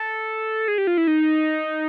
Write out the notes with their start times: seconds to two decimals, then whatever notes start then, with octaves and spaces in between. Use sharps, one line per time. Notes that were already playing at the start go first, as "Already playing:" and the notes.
Already playing: A4
0.68 G#4
0.78 G4
0.87 F4
0.98 E4
1.07 D#4